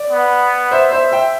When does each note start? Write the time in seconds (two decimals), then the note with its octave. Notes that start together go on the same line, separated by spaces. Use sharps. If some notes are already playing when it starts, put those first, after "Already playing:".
Already playing: D5
0.10 B3
0.71 C5 E5
0.91 C5 E5
1.12 E5 G5